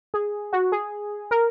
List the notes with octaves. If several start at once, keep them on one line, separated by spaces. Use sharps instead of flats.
G#4
F#4
G#4
A#4